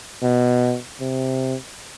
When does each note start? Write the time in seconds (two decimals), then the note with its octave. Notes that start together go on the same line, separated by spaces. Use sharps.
0.23 B2
1.01 C3